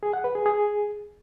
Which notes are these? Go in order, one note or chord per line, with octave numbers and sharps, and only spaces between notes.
G#4
F#5
B4
G#4
G#4